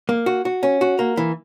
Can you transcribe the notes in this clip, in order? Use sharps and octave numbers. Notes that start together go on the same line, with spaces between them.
A#3
F#4
F#4
C#4
F#4
A#3
E3